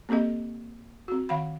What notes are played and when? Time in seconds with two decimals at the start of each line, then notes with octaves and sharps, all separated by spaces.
0.09 A#3 C4 G4 A4 D#5
1.08 C4 F#4
1.29 D#3 F5 F#5 B5